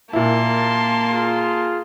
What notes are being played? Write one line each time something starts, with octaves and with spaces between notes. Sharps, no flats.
A#2 A#3 E4 A5 C6
F4 G#4